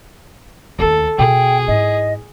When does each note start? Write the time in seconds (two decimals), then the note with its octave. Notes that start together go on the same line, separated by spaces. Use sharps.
0.79 D#2 A3 A4
1.18 B2 G#4 G5
1.68 G#2 E4 D#5